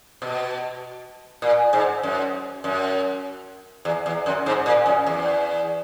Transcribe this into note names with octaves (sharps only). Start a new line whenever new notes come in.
B2
A#2
G#2
F#2
F#2
E2
E2
F#2
G#2
A#2
F#2
E2